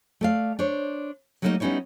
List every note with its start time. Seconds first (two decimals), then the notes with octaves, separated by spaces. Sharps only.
0.21 A3 D5 F5
0.59 D4 C5 C#5
1.42 F#3 G3 A3 A#3 C4 D#4
1.60 G3 B3 C#4 D#4 E4 C#5